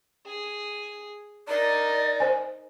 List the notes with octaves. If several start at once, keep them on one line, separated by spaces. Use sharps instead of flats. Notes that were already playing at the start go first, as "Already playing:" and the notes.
G#4
D#4 A#4 D5
C5 G#5